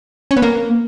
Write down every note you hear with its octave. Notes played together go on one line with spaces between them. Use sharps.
C#4
B3
A#3